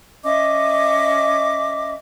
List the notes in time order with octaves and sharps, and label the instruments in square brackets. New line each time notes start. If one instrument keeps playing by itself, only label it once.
[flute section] C#4 D#5 E5 D6